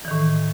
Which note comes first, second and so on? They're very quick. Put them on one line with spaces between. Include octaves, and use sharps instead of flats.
E3 D#3 A2